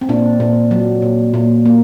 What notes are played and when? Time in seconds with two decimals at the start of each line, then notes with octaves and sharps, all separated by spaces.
0.01 C4
0.09 A#2 D4
0.40 A#2
0.71 F#3
1.02 A#2
1.34 A#2
1.65 A#3